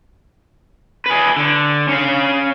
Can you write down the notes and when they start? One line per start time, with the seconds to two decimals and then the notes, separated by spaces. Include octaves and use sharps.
1.06 G#4 B4
1.36 D3
1.89 C#4 F5